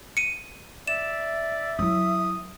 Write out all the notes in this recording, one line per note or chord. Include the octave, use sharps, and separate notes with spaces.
C#7 D#7
D5 E5 E7
F#3 E4 D#6